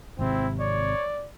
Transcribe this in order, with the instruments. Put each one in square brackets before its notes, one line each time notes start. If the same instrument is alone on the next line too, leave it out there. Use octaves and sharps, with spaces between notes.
[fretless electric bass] G#1 C3 [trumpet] C4 [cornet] E4
[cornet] C#5 [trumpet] D5